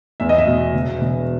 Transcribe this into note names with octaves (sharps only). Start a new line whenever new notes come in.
E2 E5
D#5
E5
B2
E1
E1